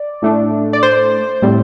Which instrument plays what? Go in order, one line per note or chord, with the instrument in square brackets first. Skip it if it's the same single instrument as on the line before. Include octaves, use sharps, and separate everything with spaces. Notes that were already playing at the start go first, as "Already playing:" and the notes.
Already playing: [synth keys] D5
A2 A3 D4
D5
C5
A2 G3 C4